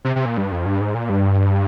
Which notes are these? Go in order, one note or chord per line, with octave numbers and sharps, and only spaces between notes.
C3
C3
A#2
G2
F2
G2
G#2
A#2
G2